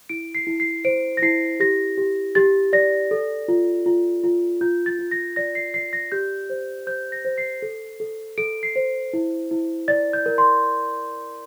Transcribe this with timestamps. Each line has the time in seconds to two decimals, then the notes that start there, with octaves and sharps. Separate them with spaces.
0.09 E4 D7
0.35 C7
0.47 E4
0.60 C7
0.85 C5 D7
1.17 A#6
1.22 E4 C7
1.60 G4 A#6
1.98 G4
2.35 G4 A6
2.73 D5 A#6
3.11 A4
3.48 F4
3.86 F4
4.24 F4
4.61 F4 G6
4.86 A6
4.99 F4
5.11 A#6
5.36 D5 A#6
5.55 C7
5.74 D5 C7
5.93 A#6
6.12 G4 G6
6.50 C5
6.87 C5 G6
7.12 A#6
7.25 C5
7.38 C7
7.62 A4
8.00 A4
8.38 A4 D7
8.63 C7
8.76 C5
9.13 E4
9.51 E4
9.88 D5 A6
10.13 G6
10.26 A#4
10.38 C6